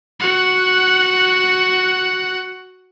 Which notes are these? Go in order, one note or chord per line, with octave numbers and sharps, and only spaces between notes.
F#4 F#5